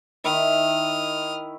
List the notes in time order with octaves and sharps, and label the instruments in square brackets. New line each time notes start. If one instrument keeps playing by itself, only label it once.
[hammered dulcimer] D#3 E4 [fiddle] D#6 F6